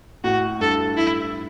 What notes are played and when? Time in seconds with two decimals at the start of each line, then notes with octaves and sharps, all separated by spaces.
0.24 A2 F#4
0.60 G2 A4
0.97 E4